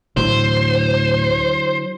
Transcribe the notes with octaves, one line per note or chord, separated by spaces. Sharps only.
D2 A2 D3 E3 F#3 C5